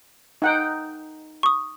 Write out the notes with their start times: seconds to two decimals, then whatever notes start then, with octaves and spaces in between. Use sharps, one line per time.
0.42 D#4 F#5 G5
1.43 C#6 D#6